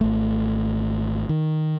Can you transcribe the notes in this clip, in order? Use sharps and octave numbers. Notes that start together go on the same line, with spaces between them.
G#1 A3
D#3